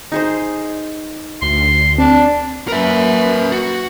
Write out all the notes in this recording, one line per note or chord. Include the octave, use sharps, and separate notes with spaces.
D#4 G#4 C5
D2 C6
C4 D4
F#2 A#3 A#4 B4 E5
F#4